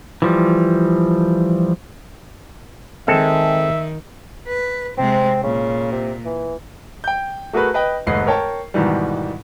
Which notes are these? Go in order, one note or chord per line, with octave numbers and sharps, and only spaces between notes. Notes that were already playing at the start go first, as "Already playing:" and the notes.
E3 F3 G3
D#3 G#3 C4 A4 E5
B4
C3 G#3 C4
A#2 C#3
C3
E3
G5 G6
A3 F#4 G#4 A#4 B4
B4 D#5 G5
F1 D#2 G#2 B4 D#5 C7
A#4 C#5 G5 A5
G#2 B2 D#3 E3 G3